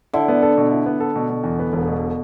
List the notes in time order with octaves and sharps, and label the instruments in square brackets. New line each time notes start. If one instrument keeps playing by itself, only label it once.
[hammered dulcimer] D3 [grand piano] E4
[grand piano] B3
A4
B2
E4
B3
A4
B2
B2
E2
B3
E1
B2